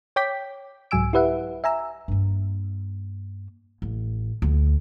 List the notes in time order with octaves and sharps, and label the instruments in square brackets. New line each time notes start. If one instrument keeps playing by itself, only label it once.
[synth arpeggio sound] C#5 G5 D6 G6 B6
C2 G#2 F#3 G#5 E6 D7
E4 G4 B4 E5 F#5
E5 G#5 A#5 E6
[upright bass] G2 A#3
A1
D2